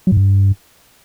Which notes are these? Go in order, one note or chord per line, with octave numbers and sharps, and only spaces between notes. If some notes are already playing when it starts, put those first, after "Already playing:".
F#3
G#2
G2